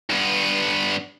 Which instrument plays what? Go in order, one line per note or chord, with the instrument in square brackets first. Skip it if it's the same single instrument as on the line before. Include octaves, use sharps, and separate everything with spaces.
[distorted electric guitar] G2 B3